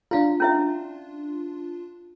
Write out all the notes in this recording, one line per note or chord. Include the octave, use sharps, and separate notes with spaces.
D4 E4 F4 F5
C#4 E4 E5